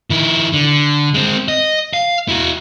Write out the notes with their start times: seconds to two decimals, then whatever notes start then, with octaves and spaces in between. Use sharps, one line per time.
0.10 D#3 E4
0.53 D3
1.14 G#3 C4
1.48 D#5
1.93 F5
2.29 E4 F#4